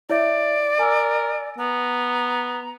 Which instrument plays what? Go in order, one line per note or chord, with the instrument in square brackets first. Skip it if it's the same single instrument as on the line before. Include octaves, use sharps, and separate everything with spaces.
[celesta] E4 C#5 E5 [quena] D5
[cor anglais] A#4 [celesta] G#5 E6
[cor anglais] B3 [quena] A#5